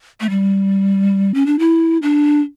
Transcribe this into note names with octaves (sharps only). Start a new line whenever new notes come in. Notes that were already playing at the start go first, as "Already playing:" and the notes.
A3
G3
C#4
D4
E4
D4